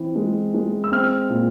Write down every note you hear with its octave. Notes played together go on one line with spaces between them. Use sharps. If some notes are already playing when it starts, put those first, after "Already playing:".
Already playing: E3 C4
G#3
G#3
E6
C4 F6
A#2